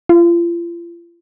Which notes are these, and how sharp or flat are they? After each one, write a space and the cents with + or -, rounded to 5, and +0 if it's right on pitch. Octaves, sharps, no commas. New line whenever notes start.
F4 -40